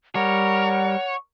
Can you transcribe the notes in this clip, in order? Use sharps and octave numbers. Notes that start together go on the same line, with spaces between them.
G3 A#4 C#5 F#5